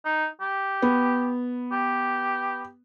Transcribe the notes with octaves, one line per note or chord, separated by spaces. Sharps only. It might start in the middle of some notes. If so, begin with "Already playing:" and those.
D#4
G4
B3
G4